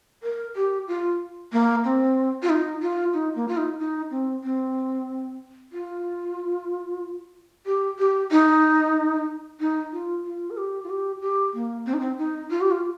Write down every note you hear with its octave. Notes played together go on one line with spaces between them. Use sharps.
A#4
G4
F4
A#3
C4
F4
D#4
F4
D#4
A#3
F4
D#4
D#4
C4
C4
F4
G4
G4
D#4
D#4
F4
F4
A#4
G4
F4
G4
G4
A#3
C4
D#4
C4
D#4
F4
G4
F4